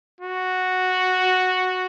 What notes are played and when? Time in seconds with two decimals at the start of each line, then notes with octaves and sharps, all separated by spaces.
0.21 F#4